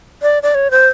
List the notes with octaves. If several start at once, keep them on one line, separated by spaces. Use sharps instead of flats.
D5
D5
C#5
C5